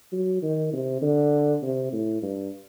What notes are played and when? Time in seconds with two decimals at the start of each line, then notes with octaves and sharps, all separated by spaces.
0.12 F#3
0.42 D#3
0.73 C3
1.02 D3
1.62 C3
1.92 A2
2.22 G2